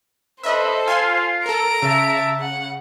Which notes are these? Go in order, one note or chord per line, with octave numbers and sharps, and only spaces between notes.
D4 A4 B4 C5 D#5 E5 B5
F4 F5 G#5 C6
A4 A#4 A#5 D7
C#3 E5 A5
F#5